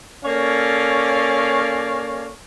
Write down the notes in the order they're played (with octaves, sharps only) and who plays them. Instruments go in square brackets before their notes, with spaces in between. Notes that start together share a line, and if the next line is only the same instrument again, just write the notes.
[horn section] A#3 C#4 A4 C#5 D5 F5